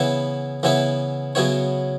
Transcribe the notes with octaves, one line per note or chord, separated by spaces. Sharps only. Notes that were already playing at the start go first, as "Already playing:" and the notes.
Already playing: C#3 E3 B3 E4 B4
C#3 E3 B3 E4 B4
C#3 F#3 B3 E4 C#5